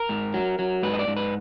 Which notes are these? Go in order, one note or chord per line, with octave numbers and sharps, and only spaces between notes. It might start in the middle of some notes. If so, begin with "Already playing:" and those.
Already playing: A#4
G#2
F#3
F#3
G#2 B4
D#5
D5
G#2
B4